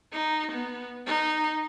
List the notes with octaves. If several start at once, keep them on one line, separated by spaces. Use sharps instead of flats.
D#4
B3
D#4